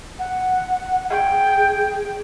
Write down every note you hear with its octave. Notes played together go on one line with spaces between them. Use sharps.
F#5
G#4 G5